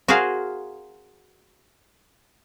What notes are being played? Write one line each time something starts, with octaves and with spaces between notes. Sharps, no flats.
F#4 G#4 A#4 C5 F5 G#5